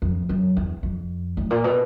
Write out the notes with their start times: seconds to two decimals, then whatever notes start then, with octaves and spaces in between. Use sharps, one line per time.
0.02 F2
0.29 F#2
0.57 E2
0.83 F2
1.37 A2
1.50 A#2
1.64 B2